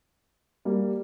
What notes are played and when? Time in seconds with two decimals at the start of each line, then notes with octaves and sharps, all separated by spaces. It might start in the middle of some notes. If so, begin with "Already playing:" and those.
0.65 G3 A#3